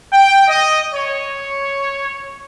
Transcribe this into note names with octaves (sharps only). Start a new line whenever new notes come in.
G5
D#5
C#5